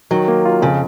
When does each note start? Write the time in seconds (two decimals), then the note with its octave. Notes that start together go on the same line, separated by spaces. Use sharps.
0.11 D#3 F#3
0.28 A#3
0.45 F4
0.62 F2 C#3